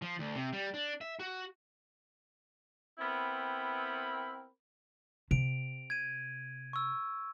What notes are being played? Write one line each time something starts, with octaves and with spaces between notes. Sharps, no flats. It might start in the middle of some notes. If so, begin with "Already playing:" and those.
F3
D2
C3
G3
D4
E5
F#4
B3 C4 E4 A#4 G5 B5
C3 D7 F7
G#6 D#7
C#6 E6